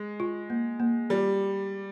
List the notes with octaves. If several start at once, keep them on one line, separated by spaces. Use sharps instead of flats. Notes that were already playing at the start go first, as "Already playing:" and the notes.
Already playing: G#3
F4
A#3
A#3
G3 F4